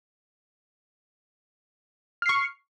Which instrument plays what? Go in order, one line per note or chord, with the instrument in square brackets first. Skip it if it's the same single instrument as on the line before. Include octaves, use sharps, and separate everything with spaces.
[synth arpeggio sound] F6
C7
C#6